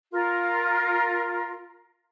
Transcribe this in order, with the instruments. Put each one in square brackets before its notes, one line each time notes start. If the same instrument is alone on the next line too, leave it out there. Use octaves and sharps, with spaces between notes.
[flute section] F4 A#4